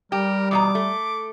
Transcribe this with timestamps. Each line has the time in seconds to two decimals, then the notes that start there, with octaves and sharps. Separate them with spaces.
0.12 G3 G4 A#4
0.51 E2 B2 A#5 D6
0.75 A3